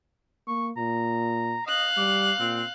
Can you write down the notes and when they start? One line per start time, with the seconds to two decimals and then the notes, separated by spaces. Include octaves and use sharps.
0.48 A#3 C#6
0.77 A#2 A#5
1.67 D#5 F5 F#6
1.97 G3 D6
2.40 A#2 C4